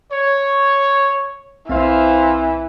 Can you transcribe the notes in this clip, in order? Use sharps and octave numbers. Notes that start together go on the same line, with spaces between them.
C#5
B1 E3 C4 C5 E5 F5